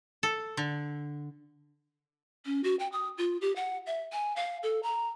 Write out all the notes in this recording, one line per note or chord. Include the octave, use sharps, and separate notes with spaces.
A4
D3
C#4
F#4
G5
D#6
F4
G4
F#5
E5
G#5
F5
A4
A#5